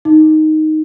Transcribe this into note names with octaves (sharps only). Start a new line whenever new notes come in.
D#4